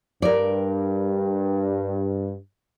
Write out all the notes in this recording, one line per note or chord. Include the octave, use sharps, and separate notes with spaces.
G2 A#4 D5